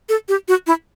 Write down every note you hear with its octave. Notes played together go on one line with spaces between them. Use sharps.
A4
G4
F#4
E4